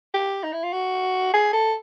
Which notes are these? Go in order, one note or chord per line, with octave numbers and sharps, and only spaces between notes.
G4
D#4
E4
F4
F#4
G#4
A4